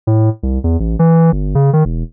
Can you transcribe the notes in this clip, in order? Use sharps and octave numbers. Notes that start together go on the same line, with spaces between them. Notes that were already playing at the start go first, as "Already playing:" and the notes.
A2
C2
E2
A1
E3
G1
C#3
D#3
E1